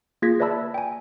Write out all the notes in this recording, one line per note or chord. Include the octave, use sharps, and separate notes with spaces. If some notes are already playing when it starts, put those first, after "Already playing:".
A#3 F4 G#4 G#6 A#6 B6
B4 D5 E5 A5 B5 E6
G5 G#5